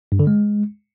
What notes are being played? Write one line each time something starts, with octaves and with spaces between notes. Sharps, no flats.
G2
D3
G#3